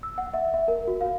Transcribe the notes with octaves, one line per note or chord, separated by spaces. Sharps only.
E6
F#5
E5
E5
A#4
F#4
F5